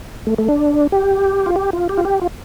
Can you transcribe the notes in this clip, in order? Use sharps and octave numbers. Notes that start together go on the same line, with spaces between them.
A3
A3
D4
G4
F4
G4
F4
G4
F4
G4
F4